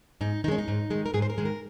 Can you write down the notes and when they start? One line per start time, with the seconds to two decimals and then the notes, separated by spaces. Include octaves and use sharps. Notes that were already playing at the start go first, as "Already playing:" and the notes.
0.21 G#2 D#4
0.44 D#3 D#4
0.48 G#3 C#4
0.58 D#4
0.68 G#2
0.90 D#3 G#3
1.06 A#4
1.14 G#2 G#4
1.22 C5
1.30 A#4
1.38 D#3 G#3
1.45 A#4